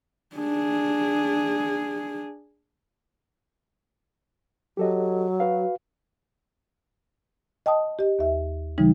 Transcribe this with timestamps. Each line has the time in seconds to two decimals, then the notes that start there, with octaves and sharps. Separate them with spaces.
0.36 D4 G#4
4.77 F#3 G4 A4 D#5
5.40 F#4 B4 F5
7.66 D#5 G5 A5 D#6
7.99 G4 D#5
8.19 D#2 E5
8.78 C#3 E3 G3 D#4